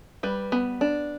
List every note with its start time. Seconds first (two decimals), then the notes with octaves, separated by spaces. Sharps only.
0.23 G3 B4
0.52 B3
0.81 D4